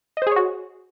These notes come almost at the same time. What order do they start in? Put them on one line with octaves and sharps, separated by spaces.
D#5 C5 G#4 C#5 F#4